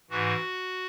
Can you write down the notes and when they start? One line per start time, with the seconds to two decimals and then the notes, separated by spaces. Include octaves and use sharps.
0.10 G#2 E3 F#4